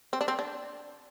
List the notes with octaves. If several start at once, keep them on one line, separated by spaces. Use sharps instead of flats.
C4
D4
C4
D4